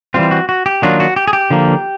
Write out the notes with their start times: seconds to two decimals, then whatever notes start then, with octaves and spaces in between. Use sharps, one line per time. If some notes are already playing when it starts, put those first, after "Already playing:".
0.14 E3 G3 C4 F4
0.31 F#4
0.49 F#4
0.66 G4
0.82 D#3 F#3 A#3 D4 F4 F#4
1.00 F#4
1.16 G4
1.28 G#4
1.33 G4
1.50 D3 F3 A#3